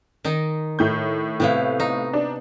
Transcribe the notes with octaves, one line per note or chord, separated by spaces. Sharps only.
D#3 D#4
A2 G6
A2 C3 B3 E4 F5
D#4
D4